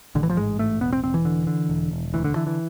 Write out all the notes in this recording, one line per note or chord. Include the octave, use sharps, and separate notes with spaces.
A1 D3
E3
F3
G#2 G#3
A1 A3
E1 B3
C4
E1 C4
E3
D3
D3
E1
E1
D2 E3
D3
D3 E3
E3